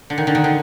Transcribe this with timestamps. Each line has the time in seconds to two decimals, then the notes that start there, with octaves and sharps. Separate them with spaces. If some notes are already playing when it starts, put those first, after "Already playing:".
0.10 D3
0.18 D#3
0.27 D3
0.35 D#3
0.44 D3